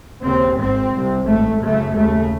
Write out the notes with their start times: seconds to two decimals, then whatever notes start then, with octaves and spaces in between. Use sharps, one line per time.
0.22 D#2 C#3 C4
0.57 G#1 G#2 C4
0.91 C2 C3
1.26 A1 G#2 A3
1.60 F#1 F#2 C#3 A3
1.94 D#2 C#3 A3